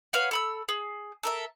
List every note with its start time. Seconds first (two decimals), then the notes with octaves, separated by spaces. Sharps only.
0.13 B4 C#5 F5 F#5
0.31 A4 B5 E6
0.69 G#4
1.23 A4 A#4 E5